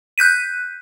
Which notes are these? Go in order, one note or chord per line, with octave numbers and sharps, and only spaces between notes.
F#6 G6 B6 D#7